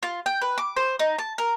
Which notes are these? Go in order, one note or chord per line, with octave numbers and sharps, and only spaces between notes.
F4
G5
B4
D6
C5
D#4
A5
A#4